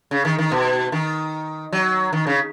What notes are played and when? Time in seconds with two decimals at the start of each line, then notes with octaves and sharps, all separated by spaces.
0.11 C#3
0.25 D#3
0.39 D#3
0.52 B2
0.92 D#3
1.73 F#3
2.13 D#3
2.27 C#3